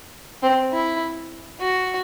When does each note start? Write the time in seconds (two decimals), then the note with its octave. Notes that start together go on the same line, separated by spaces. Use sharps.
0.42 C4
0.72 E4
1.60 F#4